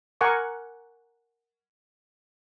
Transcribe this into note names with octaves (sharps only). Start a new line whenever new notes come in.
A#4 F#5 G#5 C#6 D6